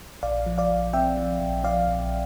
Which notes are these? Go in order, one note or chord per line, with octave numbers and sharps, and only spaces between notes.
A#1 D5 F5
F3
D5 F5
A#1
C4 E5 G5
F3
A#1
F3 D5 F5
A#1